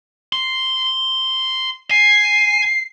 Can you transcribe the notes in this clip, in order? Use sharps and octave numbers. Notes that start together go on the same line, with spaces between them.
C6
G#5 C7